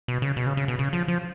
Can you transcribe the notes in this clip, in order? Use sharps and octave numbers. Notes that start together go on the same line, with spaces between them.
B2
C#3
B2
C#3
C#3
B2
C#3
F3
F3